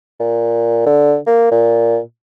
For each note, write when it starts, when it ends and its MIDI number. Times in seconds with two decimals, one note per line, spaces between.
0.20 0.82 46
0.86 1.17 50
1.27 1.47 58
1.52 1.99 46